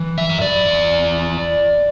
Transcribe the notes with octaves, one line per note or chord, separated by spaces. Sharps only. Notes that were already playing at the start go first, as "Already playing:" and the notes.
Already playing: E3
E5
F#2
D5
E2